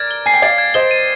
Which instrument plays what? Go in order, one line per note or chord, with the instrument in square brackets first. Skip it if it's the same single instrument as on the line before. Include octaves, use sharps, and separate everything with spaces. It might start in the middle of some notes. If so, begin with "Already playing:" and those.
Already playing: [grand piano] A#4 D5 [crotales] G#6
[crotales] G7
[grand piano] G#5 [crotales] C7
[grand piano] G5
[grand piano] D5 F5 [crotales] G#6
[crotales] G#6
[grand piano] C5 D#5 [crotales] G7
[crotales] D#7